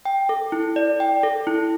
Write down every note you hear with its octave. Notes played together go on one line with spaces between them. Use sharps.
G5
A4
E4
D5
G5
A4
E4